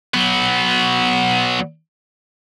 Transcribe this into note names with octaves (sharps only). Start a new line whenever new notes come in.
F#3 B3